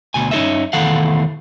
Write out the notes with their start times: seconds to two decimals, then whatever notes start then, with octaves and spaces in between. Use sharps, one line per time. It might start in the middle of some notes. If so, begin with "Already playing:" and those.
0.14 D2 B2 G#5
0.31 G2 C#4 D#4 A4 D#5 E5
0.73 E2 A2 D#3 A4 F5 F#5